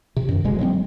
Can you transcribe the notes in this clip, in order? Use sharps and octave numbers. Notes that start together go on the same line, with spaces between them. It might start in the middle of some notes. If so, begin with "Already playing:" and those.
C3
F#2 D#3
D1 D2 G#3
F#3 G#3 B3 C4